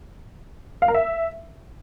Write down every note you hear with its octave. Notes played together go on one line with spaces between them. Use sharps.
F5
A#4
E5